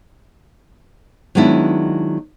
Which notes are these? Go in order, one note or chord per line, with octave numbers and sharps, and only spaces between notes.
D#3 F#3 G#3 B3 D4 E4